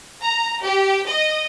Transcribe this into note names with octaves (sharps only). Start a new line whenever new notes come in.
A#5
G4
D#5